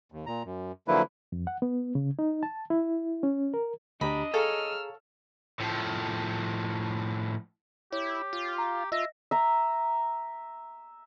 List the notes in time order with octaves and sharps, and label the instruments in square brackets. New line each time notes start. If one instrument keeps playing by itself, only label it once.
[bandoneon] D#2
A#2 A#5
F#2
D3 F3 F#3 A#3 E4 B4
[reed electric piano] F2
F#5
B3
C#3
D#4
A5
E4
C#4
A#4
[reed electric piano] D2 G4 A#5 [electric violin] D4 [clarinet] D#5 [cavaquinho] B5
[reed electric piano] G#4 A#5 [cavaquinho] A4 C#5 F5 [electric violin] E6 F6
[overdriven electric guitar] A2 F3
[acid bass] E4 [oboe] G4 [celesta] C#5
[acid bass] F4
[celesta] A#5
[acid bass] F4 [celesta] D#5 A#6 [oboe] E5
[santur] E5 A#5